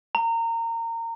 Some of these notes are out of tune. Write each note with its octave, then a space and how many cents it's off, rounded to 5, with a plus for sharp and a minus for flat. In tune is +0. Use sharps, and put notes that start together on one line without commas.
A#5 -25